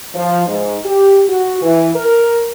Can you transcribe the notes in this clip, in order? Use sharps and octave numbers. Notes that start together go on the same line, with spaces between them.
F3
G#2
G4
F#4
E3
A#4